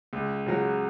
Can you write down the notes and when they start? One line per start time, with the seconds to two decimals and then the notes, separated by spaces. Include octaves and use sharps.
0.13 C#2
0.46 C#3 F#3